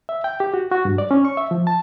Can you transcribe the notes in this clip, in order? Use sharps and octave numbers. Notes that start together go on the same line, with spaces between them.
E5
G5
G4
F#4
F#4
G2
D5
C#4
C#6
E5
F3
A5